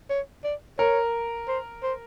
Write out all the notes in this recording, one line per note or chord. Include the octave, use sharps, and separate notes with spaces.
C#5
D5
A#4 C#5
C5
C5